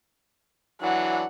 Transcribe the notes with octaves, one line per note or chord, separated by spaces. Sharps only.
E3 F#3 D4 F#5